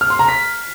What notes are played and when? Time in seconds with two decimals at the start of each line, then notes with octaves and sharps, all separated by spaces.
0.01 F6
0.10 C6
0.19 A#5
0.28 B6